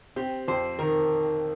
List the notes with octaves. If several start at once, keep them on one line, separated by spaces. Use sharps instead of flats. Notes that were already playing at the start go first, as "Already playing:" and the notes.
C4 G4
F2 C5
D#3 A#4